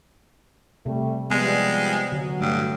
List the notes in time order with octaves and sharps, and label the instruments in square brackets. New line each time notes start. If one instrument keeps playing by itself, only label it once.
[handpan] C3 [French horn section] G3 A3
[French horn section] F3 G3 [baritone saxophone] G#3 [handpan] B3
[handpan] D3 [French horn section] F#3
[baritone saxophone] G2 [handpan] A3